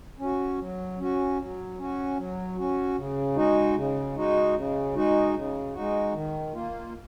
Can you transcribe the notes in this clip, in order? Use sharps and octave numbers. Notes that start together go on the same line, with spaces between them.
C#4 F#4
F#3
C#4 F#4
F#3
C#4 F#4
F#3
C#4 F#4
C#3
G#3 D#4 F#4
C#3
G#3 D#4 F#4
C#3
G#3 D#4 F#4
C#3
G#3 D#4 F#4
D#3
A#3 F4